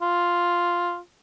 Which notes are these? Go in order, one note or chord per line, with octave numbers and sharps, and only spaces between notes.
F4